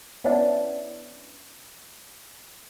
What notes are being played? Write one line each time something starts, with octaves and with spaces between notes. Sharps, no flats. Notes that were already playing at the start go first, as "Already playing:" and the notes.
B3 C#4 D4 E4